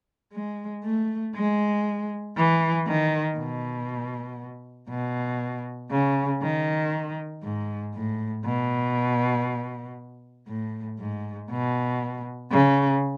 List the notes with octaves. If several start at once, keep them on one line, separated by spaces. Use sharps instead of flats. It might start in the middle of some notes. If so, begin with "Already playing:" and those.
G#3
A3
G#3
E3
D#3
B2
B2
C#3
D#3
G#2
A2
B2
A2
G#2
B2
C#3